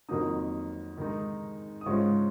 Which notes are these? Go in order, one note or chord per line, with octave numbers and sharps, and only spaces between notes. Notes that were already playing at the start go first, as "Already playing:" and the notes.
F2 D#3 F#3 A#3 D#4 D#6
D#3 G#3 D#4
D#6
G#2 F3 G#3 C#4 F4 C#6